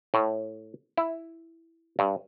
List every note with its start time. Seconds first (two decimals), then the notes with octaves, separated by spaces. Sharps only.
0.14 A2
0.97 E4
1.99 G2